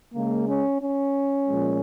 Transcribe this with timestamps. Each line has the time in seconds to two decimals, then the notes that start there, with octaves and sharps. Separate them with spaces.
0.13 C#3 G#3 A#3
0.47 C#4
0.82 C#4
1.49 A#2 F3 G#3